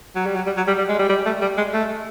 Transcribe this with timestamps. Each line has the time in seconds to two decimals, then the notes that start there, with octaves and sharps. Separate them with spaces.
0.16 F#3
0.26 G3
0.36 F#3
0.46 G3
0.57 F#3
0.67 G3
0.78 G3
0.89 G#3
0.99 G3
1.09 G3
1.25 A3
1.41 G3
1.57 G#3
1.73 A3